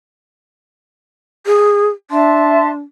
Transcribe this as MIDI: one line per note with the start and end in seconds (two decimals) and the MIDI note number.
1.46 1.90 68
2.11 2.78 62
2.11 2.67 76
2.11 2.67 81
2.11 2.67 84